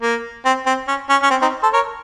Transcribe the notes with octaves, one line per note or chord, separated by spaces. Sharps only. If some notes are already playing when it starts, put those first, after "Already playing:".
A#3
C4
C4
C#4
C#4
C#4
C4
C4 D#4
A4 C5
A#4 C#5